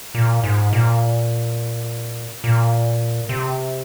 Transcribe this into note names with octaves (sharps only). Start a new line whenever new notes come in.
A#2
G#2
A#2
A#2
C3